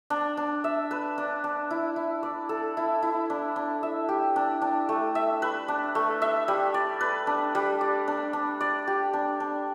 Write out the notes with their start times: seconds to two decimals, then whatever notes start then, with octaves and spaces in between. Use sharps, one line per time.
0.10 D4
0.37 D4
0.64 E5
0.91 B4
1.18 D4
1.44 D4
1.71 E4
1.96 E4
2.23 D5
2.49 A4
2.77 E4
3.03 E4
3.30 D4
3.56 D4
3.83 E5
4.09 G4
4.36 D4
4.62 D4
4.89 A3
5.15 E5
5.42 B4
5.68 D4
5.95 A3
6.22 E5
6.48 G3
6.74 D5
7.01 B4
7.27 D4
7.55 G3
7.81 D5
8.08 D4
8.33 D4
8.61 D5
8.87 G4
9.13 D4
9.40 D4